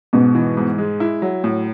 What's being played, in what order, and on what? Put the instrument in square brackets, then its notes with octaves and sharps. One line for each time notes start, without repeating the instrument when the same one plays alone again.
[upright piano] G#2 [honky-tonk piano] B2
[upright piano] E3
G#2
G#3
E4
F#3
A2